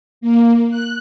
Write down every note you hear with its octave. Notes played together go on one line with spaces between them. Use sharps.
A#3
F#6